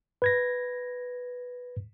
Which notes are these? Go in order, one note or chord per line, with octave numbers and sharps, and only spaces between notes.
B4 G#6 A#6